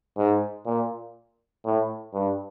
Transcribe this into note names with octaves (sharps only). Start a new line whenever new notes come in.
G#2
A#2
A2
G2